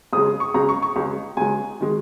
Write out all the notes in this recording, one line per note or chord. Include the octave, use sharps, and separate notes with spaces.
C#2 C#3 G#3 D#6
C#6
C#2 C#3 G#3 A#5
C#6
C#6
C#2 C#3 G#3
C#2 C#3 G#3 G#5
D#3 G#3